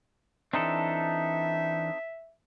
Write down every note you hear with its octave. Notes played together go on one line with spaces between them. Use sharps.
E3 C4 D4 D#4 A4 E5